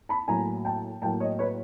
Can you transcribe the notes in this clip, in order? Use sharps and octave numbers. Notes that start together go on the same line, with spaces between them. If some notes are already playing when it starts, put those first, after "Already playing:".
A5 B5
A2 F#3 A#3 G#5 A#5
G5 A5
A2 F#3 A#3 G5 A5
C#5 D#5
B4 C#5